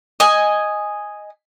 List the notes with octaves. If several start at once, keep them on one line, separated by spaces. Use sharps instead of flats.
D#5 G#5